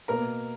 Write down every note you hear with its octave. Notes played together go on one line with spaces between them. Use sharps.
B2 A#3 A#4 A#5